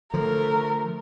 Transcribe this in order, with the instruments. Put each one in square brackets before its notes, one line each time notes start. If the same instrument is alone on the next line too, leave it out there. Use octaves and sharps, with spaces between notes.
[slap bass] D3 F3 [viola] A3 [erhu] A#4